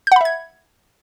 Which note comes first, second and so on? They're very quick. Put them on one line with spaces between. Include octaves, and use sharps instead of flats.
G6 F#5 B5 E5 G#6